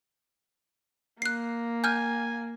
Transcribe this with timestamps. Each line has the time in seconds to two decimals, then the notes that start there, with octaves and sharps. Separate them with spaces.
1.22 A#3 F#6 C7
1.84 G#5 F6 G6